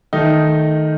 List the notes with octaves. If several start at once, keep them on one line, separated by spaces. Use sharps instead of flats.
D#3 A3 D#4